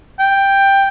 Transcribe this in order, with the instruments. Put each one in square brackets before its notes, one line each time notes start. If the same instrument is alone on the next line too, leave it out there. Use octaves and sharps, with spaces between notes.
[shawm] G5